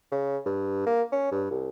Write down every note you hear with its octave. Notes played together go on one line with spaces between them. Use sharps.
C#3
G2
A#3
C#4
G2
C2